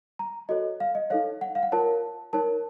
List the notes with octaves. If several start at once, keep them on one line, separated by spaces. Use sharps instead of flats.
A#5
F#4 A4 C#5 D#5
F5
D#5
D#4 A4 C#5 F5
F#5
F5
F#5
F4 A#4 C#5 A5
D#4 A#4 C#5 A5